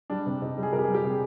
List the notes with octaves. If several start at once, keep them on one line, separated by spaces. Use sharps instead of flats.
G3 D4
C3
C3 D#4
G3
G#4
C3 A#4
G4
G3 G#4
G4
C3 G#4